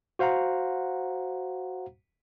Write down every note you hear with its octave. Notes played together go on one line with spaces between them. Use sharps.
F#4 C5 F5 F#5 A#5